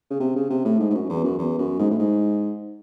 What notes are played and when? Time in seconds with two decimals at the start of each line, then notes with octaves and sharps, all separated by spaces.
0.11 C#3
0.20 C3
0.36 C#3
0.50 C3
0.65 A2
0.80 G#2
0.90 G#2
0.94 F#2
1.10 E2
1.24 F#2
1.39 E2
1.59 F#2
1.79 G#2
1.91 A2
1.99 G#2